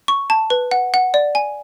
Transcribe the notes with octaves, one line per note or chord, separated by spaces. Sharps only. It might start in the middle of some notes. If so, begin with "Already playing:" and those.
C#6
A5
B4
F#5
F#5
D5
G#5